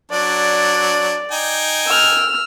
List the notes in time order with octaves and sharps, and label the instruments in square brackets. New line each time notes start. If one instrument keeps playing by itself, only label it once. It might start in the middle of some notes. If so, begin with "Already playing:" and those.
[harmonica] F#3 D4 [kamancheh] D5
[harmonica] D#4 G5 G#5
[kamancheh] E6 F6